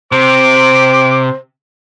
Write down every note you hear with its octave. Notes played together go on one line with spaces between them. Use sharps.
C3 C5 D6